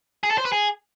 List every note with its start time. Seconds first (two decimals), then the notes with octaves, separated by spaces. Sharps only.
0.23 G#4
0.31 A4
0.38 C5
0.45 B4
0.52 G#4